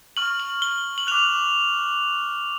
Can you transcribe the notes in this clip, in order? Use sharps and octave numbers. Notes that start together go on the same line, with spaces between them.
C#6 F6 F#7
F#7
G7
F#7
D6 F#6 F7